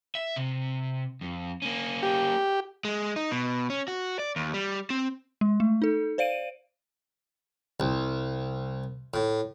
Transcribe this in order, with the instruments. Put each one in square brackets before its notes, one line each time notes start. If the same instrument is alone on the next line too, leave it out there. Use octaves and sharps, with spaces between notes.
[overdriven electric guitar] E5
C3
F2
A#3 C#4
[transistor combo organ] G4
[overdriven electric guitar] G#3
D#4
B2
C#4
F#4
D5
D#2
G3
C4
[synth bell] G#3
A3
D#4 A4
C5 D5 F5 D7 D#7
[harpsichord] C2
A2